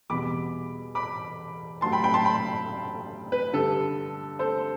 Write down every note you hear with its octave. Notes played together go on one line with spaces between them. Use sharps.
E2 B2 G3 B5 D6
B5 D6
G2 F#3 A3 A5 C6
G5 B5
G5 B5
A5 C6
G5 B5
B4
G2 D3 G3 A4
A4 C5